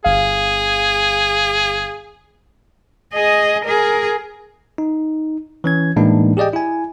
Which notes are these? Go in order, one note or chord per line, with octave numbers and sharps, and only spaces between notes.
G1 G#4 F5
G#4 D#5
G#4 A#4
D#4
E3 C#4 G#6
A2 E3 G#3 A#3 D4 D#4
G4 G#4 D5 D#5 G5
E4 G#5